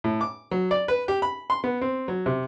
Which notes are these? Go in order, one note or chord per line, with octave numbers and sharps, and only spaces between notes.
A2
D6
F#3
D5
B4
G4
B5
C6
B3
C4
F#3
C3